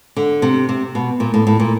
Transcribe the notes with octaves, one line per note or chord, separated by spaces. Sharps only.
D3
C3
C3
B2
A#2
A2
A2
A#2